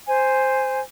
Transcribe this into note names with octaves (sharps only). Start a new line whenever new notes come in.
C5 G#5